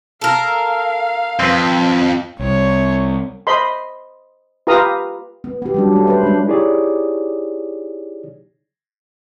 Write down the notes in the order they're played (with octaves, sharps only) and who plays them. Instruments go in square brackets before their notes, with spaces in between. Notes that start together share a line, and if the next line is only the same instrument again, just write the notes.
[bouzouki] A4 A#4 [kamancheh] F5
[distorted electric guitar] F2 [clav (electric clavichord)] C4 B4
[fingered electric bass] C2 [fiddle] C#5
[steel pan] C5 D#5 B5 C6
F4 G4 B4 F5 A#5 D#6
[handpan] B3
B3 G4
F#3 G3 D4
G3 A3
B4 C5
G#3 D4
[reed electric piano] D#4 E4 G4 G#4 C#5 D5